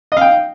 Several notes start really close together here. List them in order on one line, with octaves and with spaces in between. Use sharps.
D#5 F5 G5